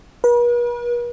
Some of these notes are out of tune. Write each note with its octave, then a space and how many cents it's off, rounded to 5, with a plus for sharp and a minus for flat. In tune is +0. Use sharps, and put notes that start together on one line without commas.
B4 -45